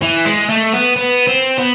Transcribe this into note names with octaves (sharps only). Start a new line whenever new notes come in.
E3
G#3
A3
B3
B3
C4
B3